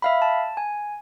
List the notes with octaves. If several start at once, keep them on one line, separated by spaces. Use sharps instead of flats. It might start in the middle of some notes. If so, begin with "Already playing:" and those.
E5 F5 B5
A5
G#5